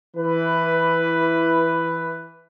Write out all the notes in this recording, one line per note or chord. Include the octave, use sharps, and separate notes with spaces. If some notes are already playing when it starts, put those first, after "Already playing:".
E3 B4